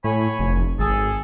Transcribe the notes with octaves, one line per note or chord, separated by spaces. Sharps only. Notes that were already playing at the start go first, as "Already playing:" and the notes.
A2 C#5 G#5 B5
F1
G#1 G#4 A4